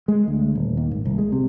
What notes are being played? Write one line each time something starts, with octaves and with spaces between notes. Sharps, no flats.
G#3
D2
D#1
D#2
G#1
C2
G#3
C3